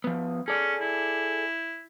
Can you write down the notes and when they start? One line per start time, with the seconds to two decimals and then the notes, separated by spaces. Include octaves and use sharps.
0.04 F3 B3
0.48 C#4 G#4 A4 D5
0.81 E4